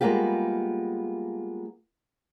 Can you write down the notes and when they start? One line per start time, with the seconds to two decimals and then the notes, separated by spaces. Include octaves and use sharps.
0.01 G3 G#3 A#3 B3 F4 G4